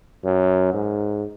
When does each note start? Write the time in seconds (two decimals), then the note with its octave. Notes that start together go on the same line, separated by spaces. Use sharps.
0.25 F#2
0.73 G#2